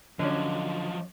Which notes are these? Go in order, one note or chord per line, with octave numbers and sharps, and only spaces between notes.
D3 F3 F#3 C#4 D5 D#5